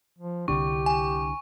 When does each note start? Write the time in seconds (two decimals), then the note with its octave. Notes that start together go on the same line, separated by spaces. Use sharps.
0.19 F3
0.48 C2 D3 D4 G4 C#6
0.86 G#5